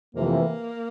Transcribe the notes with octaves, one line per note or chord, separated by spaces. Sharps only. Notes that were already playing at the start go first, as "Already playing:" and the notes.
F2 C3 E3 A3 A#3